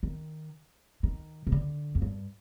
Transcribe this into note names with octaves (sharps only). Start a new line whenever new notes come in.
D#3
D#3
C3
D3
F2
G2